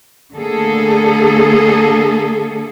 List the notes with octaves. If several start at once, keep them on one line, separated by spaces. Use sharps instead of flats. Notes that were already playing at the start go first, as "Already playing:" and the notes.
D3 A3 A#3 G#4 A4